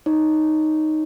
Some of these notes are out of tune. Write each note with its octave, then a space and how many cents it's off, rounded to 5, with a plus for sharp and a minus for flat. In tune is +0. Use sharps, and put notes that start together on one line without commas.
D#4 +0 C#5 +0